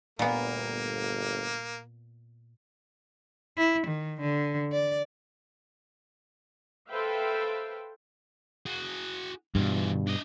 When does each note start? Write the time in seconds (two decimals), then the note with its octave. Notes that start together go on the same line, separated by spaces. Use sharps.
0.19 G1 D2 A#2 A#3 B3
3.58 E4
3.87 D#3
4.20 D3
4.72 D5
6.89 A4 B4 C5 E5 F5 G5
8.66 F#4 G#4
9.55 G2 B2 E3 F4
10.07 D4 D#5